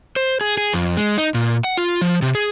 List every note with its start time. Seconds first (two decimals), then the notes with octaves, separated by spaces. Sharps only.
0.16 C5
0.41 G#4
0.57 G#4
0.73 F2
0.97 G#3
1.18 D#4
1.34 A#2
1.64 F#5
1.77 F4
2.01 F3
2.22 C3
2.35 G#4